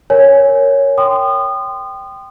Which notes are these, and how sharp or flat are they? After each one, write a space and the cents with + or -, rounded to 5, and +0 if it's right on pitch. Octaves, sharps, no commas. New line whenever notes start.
A#4 -10 C#5 +0 G#5 +0
G5 -10 C6 -20 D#6 -30